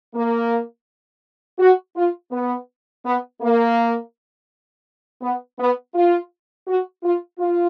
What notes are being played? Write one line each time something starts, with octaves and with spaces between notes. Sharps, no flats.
A#3
F#4
F4
B3
B3
A#3
B3
B3
F4
F#4
F4
F4